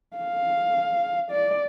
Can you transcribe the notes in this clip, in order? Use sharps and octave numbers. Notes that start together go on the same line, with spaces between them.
F5
D5